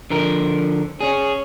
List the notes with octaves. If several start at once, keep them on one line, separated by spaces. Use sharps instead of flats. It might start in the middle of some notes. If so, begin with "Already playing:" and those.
D3 F3 A#4
C#4 G#4